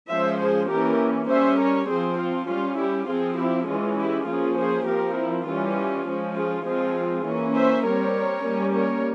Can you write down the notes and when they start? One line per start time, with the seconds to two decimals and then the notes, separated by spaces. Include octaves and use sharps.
0.10 F3 G#3 C#4 C5 E5
0.40 G#4 C5
0.70 E3 A#3 C#4 G4 A#4
1.30 G3 C#4 C5 E5
1.60 A#4 C#5
1.89 F3 C4 G#4 C5
2.19 F4
2.49 G3 C#4 F4
2.79 E4 G4
3.09 F3 C4 F4 G#4
3.39 E4 G4
3.68 E3 G#3 C#4 F4
3.98 E4 G4
4.28 F3 A#3 C#4 F4 G#4
4.57 G#4 C5
4.87 F3 C4 G4 A#4
5.17 E4
5.47 E3 G3 C#4 F4
5.76 F4
6.07 F3 G#3 C#4
6.36 F4 G#4
6.66 F3 G#3 C4 F4 G#4
7.26 E3 A#3 C#4
7.56 C5 E5
7.85 G3 C4 A#4 C#5
8.45 G3 A#3 C#4
8.75 A#4 C#5